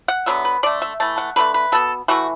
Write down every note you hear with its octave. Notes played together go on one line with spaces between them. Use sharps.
F#5
D3 F#3 B3 E5
B4
D3 A3 D5
E5
E3 A3 A5
F#5
D3 F#3 A3 B4
B4
B2 B3 A4
E3 A3 F#4